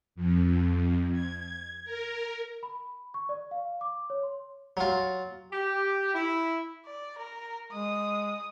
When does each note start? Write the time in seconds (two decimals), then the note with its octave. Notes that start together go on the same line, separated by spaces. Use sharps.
0.16 F2
1.12 G#6
1.85 A#4
2.63 B5
3.14 C#6
3.29 D5
3.51 F5
3.81 D6
4.10 C#5
4.23 C6
4.77 F#3 F4
5.52 G4
6.13 E4
6.86 D5
7.18 A#4
7.72 G#3 D#6